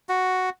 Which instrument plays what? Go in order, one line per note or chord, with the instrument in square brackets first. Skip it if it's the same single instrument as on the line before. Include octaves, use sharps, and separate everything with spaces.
[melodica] F#4